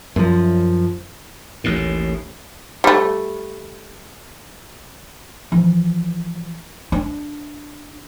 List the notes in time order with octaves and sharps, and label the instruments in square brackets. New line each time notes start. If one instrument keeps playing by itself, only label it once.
[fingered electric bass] F#2 F3
[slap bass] A1 D#2 A2
[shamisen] G3 A3
[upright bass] E3 F3
D4